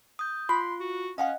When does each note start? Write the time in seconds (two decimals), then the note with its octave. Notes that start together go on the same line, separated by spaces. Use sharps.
0.19 D#6 G6
0.49 F4 B5 C6
0.80 F#4
1.18 C#4 D#5 F5 F#5